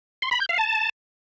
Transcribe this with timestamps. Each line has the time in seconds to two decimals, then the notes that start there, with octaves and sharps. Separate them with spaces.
0.22 C6
0.31 B5
0.40 G6
0.49 F5
0.58 A5